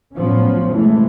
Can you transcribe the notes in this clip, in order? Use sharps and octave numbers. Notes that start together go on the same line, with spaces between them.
A2 F3 F#3 B3 C#4
C3 E3 G#3 A3